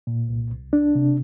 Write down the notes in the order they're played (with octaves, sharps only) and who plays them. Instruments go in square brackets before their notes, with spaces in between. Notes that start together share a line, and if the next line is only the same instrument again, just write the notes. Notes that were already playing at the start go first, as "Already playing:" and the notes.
[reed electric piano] A#2
C2
C2
D4
C3